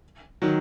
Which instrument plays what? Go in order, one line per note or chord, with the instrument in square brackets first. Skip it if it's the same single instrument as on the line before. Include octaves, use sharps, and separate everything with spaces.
[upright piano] D#3 F#3